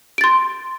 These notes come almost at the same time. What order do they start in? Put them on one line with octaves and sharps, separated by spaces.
D7 A6 C6